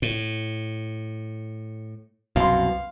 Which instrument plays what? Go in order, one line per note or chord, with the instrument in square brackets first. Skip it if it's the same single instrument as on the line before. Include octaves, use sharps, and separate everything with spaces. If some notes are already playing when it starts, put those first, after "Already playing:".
[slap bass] A2
[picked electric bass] C2 F#2 B2 [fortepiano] F5 C6